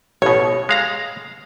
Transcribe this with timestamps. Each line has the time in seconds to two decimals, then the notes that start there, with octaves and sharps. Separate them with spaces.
0.22 A1 B2 C#5
0.69 G#3 F5 A#5